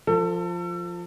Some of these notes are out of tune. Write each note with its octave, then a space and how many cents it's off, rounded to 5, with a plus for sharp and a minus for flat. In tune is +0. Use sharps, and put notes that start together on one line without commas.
F3 +0 A4 +30